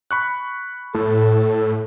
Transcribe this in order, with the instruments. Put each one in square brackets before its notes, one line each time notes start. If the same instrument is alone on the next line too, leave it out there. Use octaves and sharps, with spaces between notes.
[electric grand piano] B5 C#6 F#6
[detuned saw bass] A2 [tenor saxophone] A4